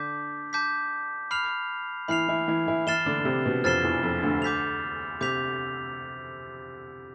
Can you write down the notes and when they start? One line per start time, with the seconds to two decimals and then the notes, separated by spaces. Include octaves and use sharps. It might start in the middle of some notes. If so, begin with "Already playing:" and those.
Already playing: D3 D4 A5 D6 G6 B6
0.53 A5 D6 G6 B6
1.31 B5 F6 C7 F7
2.08 E3 E4 B5 F6 C7 F7
2.28 E3 E4
2.48 E3 E4
2.68 E3 E4
2.87 E3 E4 F6 A6 C7 E7 G7
3.06 D3 D4
3.19 D4
3.25 C3 C4
3.46 B2 B3
3.64 F2 F3 F6 A6 C7 E7 G7
3.83 E2 E3
4.03 F2
4.23 D2 D3
4.42 D6 G6 B6 F7
5.21 C3 D6 G6 B6 F7